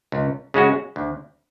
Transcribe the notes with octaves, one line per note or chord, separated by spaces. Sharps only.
C#2
C#3 G#3 C#4 F#4
D2